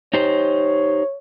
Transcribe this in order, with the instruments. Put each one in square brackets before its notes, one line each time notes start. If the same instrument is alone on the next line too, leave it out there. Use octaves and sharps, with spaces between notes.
[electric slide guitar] D#4 G4 C5 [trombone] C#5